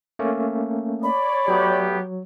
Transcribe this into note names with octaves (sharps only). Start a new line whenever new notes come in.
A3 A#3 C#4
C#5 D5 B5
F#3 A3 B3 G4